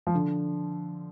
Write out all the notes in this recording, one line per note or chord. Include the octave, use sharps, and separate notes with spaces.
F3
D3